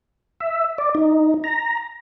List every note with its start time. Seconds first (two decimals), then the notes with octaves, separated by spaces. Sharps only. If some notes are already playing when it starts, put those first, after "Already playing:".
0.40 E5
0.78 D5
0.95 D#4
1.44 A#5